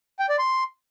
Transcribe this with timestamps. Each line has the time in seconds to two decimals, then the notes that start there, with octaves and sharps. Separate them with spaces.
0.19 G5
0.29 D5
0.39 C6